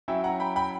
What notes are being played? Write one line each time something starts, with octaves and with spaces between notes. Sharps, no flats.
F#3 C#4 E4 E5 G5
F#5 A#5
G5 B5
G5 B5